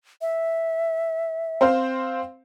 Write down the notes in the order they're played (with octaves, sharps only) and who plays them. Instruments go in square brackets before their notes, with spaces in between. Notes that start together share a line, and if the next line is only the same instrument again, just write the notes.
[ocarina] E5
[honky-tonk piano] C4 C5 F5